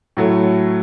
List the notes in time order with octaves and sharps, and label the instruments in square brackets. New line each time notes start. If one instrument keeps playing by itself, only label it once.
[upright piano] A2 F#3 A3